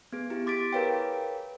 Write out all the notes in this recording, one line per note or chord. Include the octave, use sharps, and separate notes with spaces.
B3 G#4
E4 G4
C6 D6 A6 B6 D7
G#4 A#4 B4 C#5 F5 G5